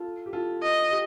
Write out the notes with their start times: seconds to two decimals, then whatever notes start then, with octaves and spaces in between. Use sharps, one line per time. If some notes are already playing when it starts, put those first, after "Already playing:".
Already playing: F4 A4
0.26 G4
0.33 F4 A4
0.62 D#5
0.91 G4